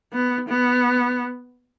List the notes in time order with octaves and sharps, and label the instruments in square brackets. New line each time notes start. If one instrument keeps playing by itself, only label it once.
[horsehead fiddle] B3
B3